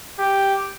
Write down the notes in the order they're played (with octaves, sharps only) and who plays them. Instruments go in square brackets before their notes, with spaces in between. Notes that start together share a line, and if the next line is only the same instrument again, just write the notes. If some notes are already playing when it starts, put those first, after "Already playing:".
[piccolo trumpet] G4